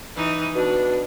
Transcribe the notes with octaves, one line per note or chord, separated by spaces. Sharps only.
E3 D#4
B2 D4